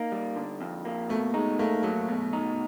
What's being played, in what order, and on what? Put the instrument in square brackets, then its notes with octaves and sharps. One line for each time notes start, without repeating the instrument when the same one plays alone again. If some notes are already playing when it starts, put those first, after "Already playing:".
Already playing: [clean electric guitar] A#3 [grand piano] D#4
[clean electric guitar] G3
D3
F2
A#3
[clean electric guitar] B2 [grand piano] A3
[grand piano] G#3 [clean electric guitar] D#4
[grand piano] A3 [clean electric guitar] A#3
[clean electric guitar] F#3 [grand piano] A3
[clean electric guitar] B2
D#4